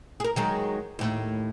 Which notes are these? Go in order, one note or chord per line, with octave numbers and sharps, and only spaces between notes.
G#4 A#4
D#3 F#3 G#3
D#2 A2